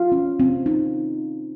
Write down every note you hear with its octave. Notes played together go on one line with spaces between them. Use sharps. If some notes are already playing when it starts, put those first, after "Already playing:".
Already playing: F4 F5
C#4
C4
D#4